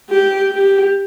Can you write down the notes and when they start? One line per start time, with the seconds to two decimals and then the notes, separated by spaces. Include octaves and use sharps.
0.10 G4
0.52 G4